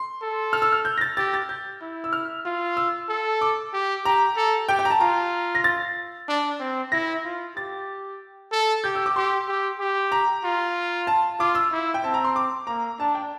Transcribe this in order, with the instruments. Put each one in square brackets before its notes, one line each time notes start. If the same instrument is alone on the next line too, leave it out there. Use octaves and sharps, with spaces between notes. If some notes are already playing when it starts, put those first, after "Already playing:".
Already playing: [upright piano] C6
[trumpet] A4
[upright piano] F6
E6
F6
G6
A#6
A6
[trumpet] G4 [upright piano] A6
[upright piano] A6
G6
[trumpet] E4
[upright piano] E6
F6
[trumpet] F4
[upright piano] E6
[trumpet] A4
[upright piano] D6
[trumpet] G4
[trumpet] G4 [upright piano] A#5
[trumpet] A4
[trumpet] G4 [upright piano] G5
[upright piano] G5
A#5
A5
[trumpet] F4 [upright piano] A#5
[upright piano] A#6
A6
[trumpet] D4
C4
[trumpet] E4 [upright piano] A#6
[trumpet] F4
[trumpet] G4 [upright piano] A6
[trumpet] A4
[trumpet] G4 [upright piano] G6
[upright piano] E6
D6
[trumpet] G4 [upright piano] C6
[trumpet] G4
G4
[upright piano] A#5
[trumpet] F4
[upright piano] A5
[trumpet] F4 [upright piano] D6
[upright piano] E6
[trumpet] E4
[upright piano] G5
[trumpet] C4 [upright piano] A5
[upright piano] A#5
C6
D6
[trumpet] A#3 [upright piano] A#5
[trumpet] D4 [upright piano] A5
[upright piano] G5